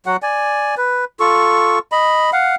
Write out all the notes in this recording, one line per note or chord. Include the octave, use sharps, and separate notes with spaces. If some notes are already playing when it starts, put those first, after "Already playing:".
F#3 F#4 F#5
D5 G#5
B4
F4 A4 C#6
D#5 B5
F5 F#5